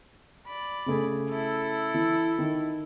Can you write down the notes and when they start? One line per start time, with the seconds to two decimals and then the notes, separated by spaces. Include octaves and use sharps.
0.47 D5 B5
0.86 C#3 A3 G#4
1.30 E4 A4
1.94 E3
2.39 D#3